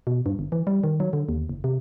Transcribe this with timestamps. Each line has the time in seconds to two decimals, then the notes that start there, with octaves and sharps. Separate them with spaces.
0.07 B2
0.26 G2
0.39 G1
0.52 E3
0.67 G3
0.84 D#3
1.00 F#3
1.13 D3
1.29 D#2
1.49 F#1
1.64 C3